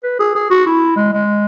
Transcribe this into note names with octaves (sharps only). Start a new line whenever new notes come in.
B4
G#4
G#4
F#4
E4
G#3
G#3